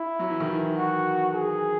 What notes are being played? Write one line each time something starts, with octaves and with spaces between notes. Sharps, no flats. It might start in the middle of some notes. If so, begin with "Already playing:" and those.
Already playing: E4
F#3
E3
D#3
E3
F#4
G#4